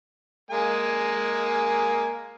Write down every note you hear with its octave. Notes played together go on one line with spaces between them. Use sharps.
G#3 A#3 G#5